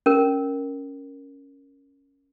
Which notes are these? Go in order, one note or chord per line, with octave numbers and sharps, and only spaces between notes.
C#4 A#4